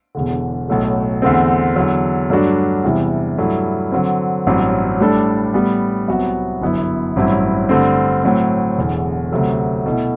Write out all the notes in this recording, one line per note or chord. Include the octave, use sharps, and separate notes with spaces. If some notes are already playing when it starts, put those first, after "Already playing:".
E1 E2 D3
B1 A2 F#3 A3
E2 D3 A3 C4
E2 D3 F#3
G2 F#3 A3 D4 F#4
E2 C3 E3 G3
G2 F#3 A3 E4
D3 F#3 C4
A1 G2 F#3 C4
A2 G3 D4 A4
A2 G3 B3
C2 C3 F#3 B3 F#4
G1 F#2 F#3 B3 E4
A1 G2 F#3 C4 E4
G2 D3 A3 C4
A2 F#3 C4
E1 E2 D3
D2 C3 F#3 A3
B2 A3 E4